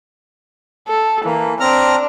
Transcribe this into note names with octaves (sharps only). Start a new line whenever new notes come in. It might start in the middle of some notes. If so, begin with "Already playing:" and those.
A4
E3 A#3
C4 D4 A#5 F6